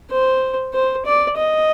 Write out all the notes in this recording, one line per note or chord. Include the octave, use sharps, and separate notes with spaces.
C5
C5
D5
D#5